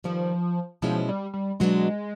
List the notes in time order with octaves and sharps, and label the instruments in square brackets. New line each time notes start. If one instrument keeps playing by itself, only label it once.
[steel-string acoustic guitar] G2 D#3 G3 [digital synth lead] F3
[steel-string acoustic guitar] B2 G#3 C#4 E4 [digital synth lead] F3
[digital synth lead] G3
G3
[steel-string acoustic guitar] B2 F#3 B3 D4 [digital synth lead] G#3